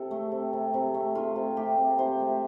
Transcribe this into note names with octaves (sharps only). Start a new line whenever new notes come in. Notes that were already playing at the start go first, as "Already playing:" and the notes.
Already playing: C3 A4
A3
C3
C3
C3
A3
A3 F4
C3
A3 G4
C3
C3 C5
A3